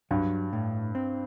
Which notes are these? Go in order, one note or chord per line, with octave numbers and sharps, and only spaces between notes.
G2 F#3
A2
C4